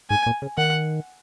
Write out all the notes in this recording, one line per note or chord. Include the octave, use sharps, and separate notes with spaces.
G#2 G#5
A#2
C#3
D#3 F#5